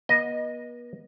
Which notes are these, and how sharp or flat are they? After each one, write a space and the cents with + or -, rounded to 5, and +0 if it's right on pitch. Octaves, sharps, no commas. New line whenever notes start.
B3 -40 D#5 +0